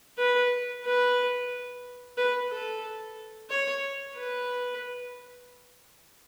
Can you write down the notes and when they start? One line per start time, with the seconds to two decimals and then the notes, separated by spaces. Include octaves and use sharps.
0.18 B4
0.84 B4
2.17 B4
2.50 A4
3.49 C#5
4.16 B4